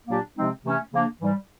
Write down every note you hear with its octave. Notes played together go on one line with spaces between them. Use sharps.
A#2 F#3 A#3 D4 G4
C3 F3 G#3 C4 D#4
C3 E3 A3 C#4
C#3 F3 A#3 D4
G#2 E3 G3